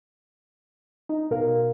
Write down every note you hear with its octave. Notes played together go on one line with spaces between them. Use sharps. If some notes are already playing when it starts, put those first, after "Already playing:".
D#4
B2 A#4 F5